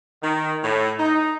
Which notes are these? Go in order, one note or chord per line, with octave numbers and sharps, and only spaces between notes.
D#3
A2
D#4